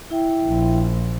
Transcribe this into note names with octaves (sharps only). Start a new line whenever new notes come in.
E4 E5 G5
A#1